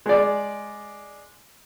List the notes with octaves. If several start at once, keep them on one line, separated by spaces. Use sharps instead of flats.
G#3 D5